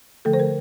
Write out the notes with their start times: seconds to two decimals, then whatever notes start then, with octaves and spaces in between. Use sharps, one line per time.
0.25 D3 F3 A3 A4
0.33 C5
0.40 A#4